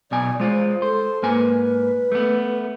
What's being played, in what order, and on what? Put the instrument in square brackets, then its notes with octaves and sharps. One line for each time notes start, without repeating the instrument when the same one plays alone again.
[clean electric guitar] B1 B2 G#5 [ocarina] D5
[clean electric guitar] G#3 F4 [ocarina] C5
[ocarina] A4 [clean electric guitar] C5
[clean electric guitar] G#2 A#3 G#5 [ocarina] B4
[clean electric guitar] A3 B3